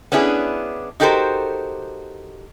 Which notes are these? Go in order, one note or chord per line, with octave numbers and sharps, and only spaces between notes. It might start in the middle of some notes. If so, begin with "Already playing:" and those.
B3 C#4 D4 E4 G#4
D#4 F#4 G4 A4 A#4 C5